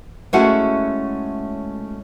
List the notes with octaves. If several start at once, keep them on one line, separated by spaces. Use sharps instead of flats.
G#3 A3 C#4 E4 F#4 F#5